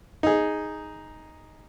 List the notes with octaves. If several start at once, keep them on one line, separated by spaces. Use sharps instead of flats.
D#4 G#4